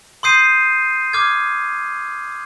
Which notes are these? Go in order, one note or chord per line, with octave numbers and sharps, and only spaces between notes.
C6 D#6 G6 C7 D#7
D6 F6 G#6